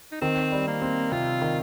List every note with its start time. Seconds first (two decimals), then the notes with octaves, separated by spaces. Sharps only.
0.12 D#4
0.21 D#3 C4
0.52 G3
0.67 A#3
0.82 C4
1.12 C3 F4
1.42 D#3